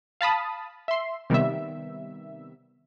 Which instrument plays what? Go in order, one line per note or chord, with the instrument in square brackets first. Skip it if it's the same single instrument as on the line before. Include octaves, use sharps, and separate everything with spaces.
[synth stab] F5 A5 B5 D#6
E5 C6
C3 D#3 G3 B3 E5